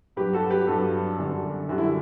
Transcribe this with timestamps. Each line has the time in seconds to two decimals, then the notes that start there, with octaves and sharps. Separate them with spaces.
0.16 G2 F#3 G4 B4
0.33 F#4 A4
0.50 G4 B4
0.67 G2 F#3 F#4 A4
1.18 F#2 D3 G3
1.69 F#2 D3 G3 F#4
1.78 E4